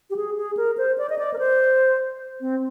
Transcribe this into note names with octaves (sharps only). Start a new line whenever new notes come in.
G4
G#4
G#4
A#4
C5
D5
D#5
D5
A#4
C5
C4